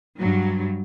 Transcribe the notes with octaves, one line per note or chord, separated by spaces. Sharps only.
G2 F#3